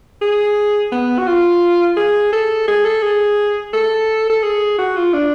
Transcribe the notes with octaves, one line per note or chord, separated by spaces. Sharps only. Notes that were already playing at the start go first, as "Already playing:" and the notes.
G#4
B3
F#4
F4
G#4
A4
G#4
A4
G#4
A4
A4
G#4
F#4
F4
D4